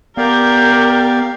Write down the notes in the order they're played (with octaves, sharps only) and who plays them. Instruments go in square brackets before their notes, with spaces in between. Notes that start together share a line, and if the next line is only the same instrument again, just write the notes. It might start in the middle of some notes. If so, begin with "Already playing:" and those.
[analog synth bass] B3 [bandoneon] G4 D5 F5 [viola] A#4 [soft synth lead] G6